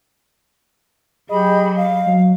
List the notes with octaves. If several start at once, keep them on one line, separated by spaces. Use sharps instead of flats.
F#3 G4 G#4 D#5 B5
F5
F#3